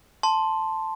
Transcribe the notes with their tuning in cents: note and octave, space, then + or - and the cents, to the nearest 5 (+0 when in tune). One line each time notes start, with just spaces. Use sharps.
A5 +0 C6 +5